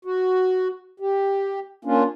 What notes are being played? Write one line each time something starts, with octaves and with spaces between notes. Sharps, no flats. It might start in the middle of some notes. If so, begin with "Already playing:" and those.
F#4
G4
A#3 C#4 D4 F4